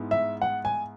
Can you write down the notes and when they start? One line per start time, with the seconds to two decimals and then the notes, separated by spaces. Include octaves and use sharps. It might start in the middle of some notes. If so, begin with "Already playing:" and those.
Already playing: G#2 G#3 B3 E4
0.11 E5
0.42 F#5
0.65 G#5